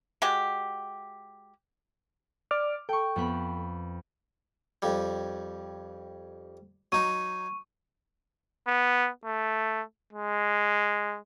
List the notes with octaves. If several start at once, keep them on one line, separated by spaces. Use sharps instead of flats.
G#3 F#4 G4
D5 D6 F6
A4 G5 C#6
F2 B3 B5
F2 G3
F#3 D#4 C#6 D#7
B3
A3
G#3